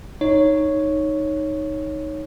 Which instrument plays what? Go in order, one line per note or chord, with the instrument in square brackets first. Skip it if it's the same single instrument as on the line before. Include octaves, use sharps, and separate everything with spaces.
[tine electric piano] D#4 C#5